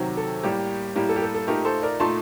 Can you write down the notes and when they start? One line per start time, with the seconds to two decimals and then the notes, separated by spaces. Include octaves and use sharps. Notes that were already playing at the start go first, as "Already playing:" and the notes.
Already playing: C3 D#3 F#3
0.17 A4
0.43 A2 G3 A#3 G4
0.95 A2 G3 A#3 G4
1.09 A4
1.16 G4
1.22 A4
1.35 A4
1.47 A#2 A3 D#4 G4 A#4
1.65 A4 C5
1.82 A#4 D5
2.00 A#2 A3 D#4 A5 C6